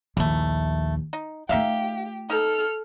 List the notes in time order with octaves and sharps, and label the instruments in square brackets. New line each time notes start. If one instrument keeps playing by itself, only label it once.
[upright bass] A#1 D#2 [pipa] E3 A3
[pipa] D#4
[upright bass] A3 F4 [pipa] D#4 E5 F5 [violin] G4
[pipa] D#4 [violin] A4 F6